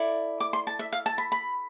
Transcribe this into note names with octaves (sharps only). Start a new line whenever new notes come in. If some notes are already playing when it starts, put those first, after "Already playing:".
Already playing: E4 A4 D5
D6
C6
A5
E5
F5
A5
B5
B5